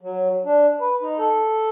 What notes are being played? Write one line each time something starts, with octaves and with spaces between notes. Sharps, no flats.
F#3
D4
B4
D#4
A4